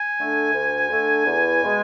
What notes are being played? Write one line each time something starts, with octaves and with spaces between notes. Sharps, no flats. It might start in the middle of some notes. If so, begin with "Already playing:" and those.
Already playing: G#5
D3 A3 D4
D2
D3 A3 D4
E2
B2 G#3